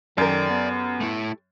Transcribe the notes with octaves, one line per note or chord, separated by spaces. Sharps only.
F#2 D#3 G4 A4 A#4 D5
B3
A3 E4